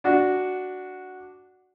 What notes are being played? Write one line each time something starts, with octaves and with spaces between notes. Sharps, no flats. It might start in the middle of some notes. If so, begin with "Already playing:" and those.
D4 F#4